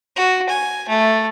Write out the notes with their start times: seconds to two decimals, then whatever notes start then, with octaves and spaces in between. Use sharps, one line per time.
0.16 F#4
0.49 G#5
0.89 A3